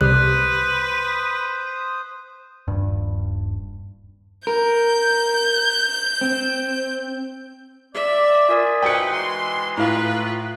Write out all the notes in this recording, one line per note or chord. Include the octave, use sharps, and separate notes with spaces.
C2 C3 B4 C5 D#6 F#6
D#1 G2
A#4 G6
C4
D5 E5
F4 A#4 D5 E5 G#5 D#6
D#4 F#4 B4 C5 G5 C#7
E3 G#3 C6
A2 F4 B4 F5 A#5